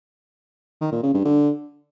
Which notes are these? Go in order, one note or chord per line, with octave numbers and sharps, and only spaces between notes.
D#3
A#2
C#3
G2
D3